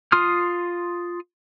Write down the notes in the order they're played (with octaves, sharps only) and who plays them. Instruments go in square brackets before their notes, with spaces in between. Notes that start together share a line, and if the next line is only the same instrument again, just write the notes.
[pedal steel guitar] F4 C6 D#6 F6